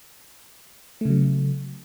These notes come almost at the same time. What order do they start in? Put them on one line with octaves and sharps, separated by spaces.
A3 C#3 F#3